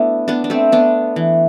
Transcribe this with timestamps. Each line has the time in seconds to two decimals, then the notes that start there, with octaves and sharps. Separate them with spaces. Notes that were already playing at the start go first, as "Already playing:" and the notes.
Already playing: A3 B3 D4 E4
0.28 B3 D4
0.44 D4
0.50 A3 C4
0.72 B3 D4
1.16 E3